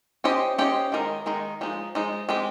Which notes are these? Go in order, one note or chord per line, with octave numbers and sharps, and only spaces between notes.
C#4 G4 C5 D#5
C#4 G4 C5 D#5
D#3 G#3 D#4 A#4
D#3 G#3 D#4 A#4
F3 G#3 D#4
F3 G#3 D#4
G#3 C4 G4